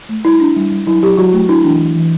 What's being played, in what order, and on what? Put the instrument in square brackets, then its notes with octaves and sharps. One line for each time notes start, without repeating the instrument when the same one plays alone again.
[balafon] A3
G3 E4
D4
G3
G3
F#3 E4
F#3 G4
F#3 F#4
A3
D4 E4
E3 D4
E3
E3